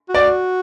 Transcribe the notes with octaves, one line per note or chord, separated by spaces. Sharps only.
F#4
D5